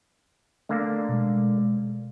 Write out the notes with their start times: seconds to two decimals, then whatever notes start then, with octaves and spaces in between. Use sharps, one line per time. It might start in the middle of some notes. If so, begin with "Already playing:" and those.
0.69 D3 A3 A#3
1.09 B2 G#3